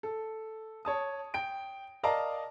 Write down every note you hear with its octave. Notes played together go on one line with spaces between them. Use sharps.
A4
C#5 A5 D#6
G5 D7
A#4 D5 D#5 F5 A5 A#5